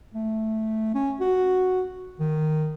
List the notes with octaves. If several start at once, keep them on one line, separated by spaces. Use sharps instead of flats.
A3
C#4
F#4
D#3